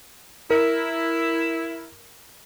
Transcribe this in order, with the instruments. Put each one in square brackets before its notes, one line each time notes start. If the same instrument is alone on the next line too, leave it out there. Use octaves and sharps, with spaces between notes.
[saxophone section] E4 [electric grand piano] A#4